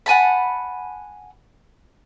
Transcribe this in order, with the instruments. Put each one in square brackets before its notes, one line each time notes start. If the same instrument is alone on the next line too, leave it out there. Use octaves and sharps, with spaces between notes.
[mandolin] F#5 G#5 A5 B5